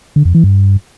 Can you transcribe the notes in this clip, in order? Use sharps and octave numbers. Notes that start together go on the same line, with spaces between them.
D3
F2
E3
G2